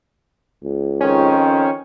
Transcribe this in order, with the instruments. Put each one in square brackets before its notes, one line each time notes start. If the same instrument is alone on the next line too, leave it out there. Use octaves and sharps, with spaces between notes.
[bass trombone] C#2
[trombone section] F2 D#3 C5 [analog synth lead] C#4